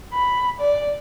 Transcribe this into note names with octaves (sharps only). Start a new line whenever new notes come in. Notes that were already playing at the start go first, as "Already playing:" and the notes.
B5
D5